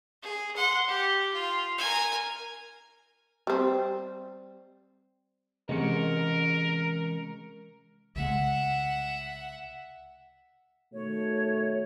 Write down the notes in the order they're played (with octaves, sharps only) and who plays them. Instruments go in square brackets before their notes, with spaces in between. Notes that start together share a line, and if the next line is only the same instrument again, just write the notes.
[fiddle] G#4
F#5 C6
G4
F4
A#4 G#5
[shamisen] G3 C4
[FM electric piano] C3 G#3 C#7 [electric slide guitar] E3 C#4 D#5 [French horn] A#4
[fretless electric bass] C2 C#3 G#3 [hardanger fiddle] E5 F#5
[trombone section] B2 D#3 A3 [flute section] C#5